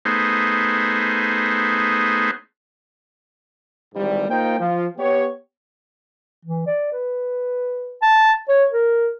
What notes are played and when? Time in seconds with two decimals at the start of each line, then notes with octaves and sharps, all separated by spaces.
0.05 A3 B3 D#4 G#4 C5
3.94 G#1 G#2 E3 G3
4.29 A#3 D#4 F4 C5 G5
4.59 F3 F4
4.98 B3 G4 C#5
6.45 E3
6.67 D5
6.92 B4
8.02 A5
8.49 C#5
8.72 A#4